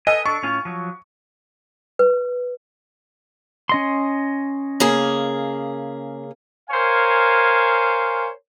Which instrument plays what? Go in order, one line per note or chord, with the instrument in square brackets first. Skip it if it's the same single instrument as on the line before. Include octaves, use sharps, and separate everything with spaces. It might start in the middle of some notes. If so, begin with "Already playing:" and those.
[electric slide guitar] A4 B4 G#5 [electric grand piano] D#5
[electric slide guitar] D4 A4 [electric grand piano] C#6
[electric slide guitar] A2 C#4 F4
F3 F#3
[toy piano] B4
[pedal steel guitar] C#4 D#5 C6
[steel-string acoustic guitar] C#3 A#3 G#4
[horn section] A#4 C5 C#5 F5 G#5